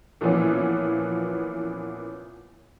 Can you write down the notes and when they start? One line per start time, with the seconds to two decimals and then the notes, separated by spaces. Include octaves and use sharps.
0.21 A#2 E3 F3 B3 C#4